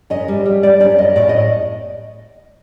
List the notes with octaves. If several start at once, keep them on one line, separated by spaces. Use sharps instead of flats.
F#2 D#5
G3
G3
G3 D5
F#2 D5
F#2 D#5
A2 D5
D#5